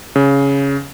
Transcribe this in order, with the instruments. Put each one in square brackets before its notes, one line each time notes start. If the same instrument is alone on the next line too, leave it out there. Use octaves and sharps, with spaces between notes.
[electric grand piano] C#3